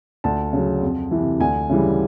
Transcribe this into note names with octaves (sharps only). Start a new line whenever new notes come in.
D2 A5
C#3 F#3
F2
C3 E3
D2 G#5
C#3 E3 G3